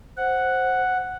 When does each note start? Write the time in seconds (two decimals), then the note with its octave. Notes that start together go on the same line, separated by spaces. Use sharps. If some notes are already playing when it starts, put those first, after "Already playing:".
0.17 C5 F#5